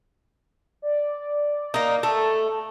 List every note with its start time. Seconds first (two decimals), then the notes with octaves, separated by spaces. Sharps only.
0.82 D5
1.74 A#3 D#4
2.03 A3 A4